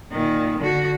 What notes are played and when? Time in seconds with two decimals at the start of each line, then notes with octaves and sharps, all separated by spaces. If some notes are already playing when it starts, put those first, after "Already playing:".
0.12 A#2 D#3
0.61 D3 F#4